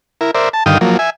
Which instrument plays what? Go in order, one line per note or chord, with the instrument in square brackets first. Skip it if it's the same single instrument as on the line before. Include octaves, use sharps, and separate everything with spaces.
[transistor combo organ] E4 A#4
A#4 C5 D5 E5
A5
G2 D3 D#3 F5 G5 D#6
F3 F#3 A#3
E5 G#5